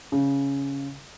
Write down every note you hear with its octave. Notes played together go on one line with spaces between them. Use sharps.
C#3